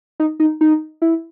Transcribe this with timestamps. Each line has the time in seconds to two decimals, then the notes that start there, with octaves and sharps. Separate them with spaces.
0.20 D#4
0.40 D#4
0.61 D#4
1.02 E4